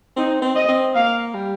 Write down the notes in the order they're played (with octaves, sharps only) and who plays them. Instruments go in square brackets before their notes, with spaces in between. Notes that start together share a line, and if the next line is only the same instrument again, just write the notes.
[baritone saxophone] C4 [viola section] D#4
[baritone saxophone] C4
[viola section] D#5
[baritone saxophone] C4
[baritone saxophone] A#3 [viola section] F5
[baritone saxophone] G3